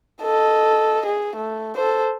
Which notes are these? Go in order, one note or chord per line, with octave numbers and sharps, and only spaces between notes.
A4 D#5
G#4
A3
A4 C5